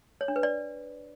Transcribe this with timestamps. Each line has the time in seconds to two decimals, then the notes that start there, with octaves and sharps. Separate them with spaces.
0.21 C#5
0.28 D4
0.36 B4
0.43 D5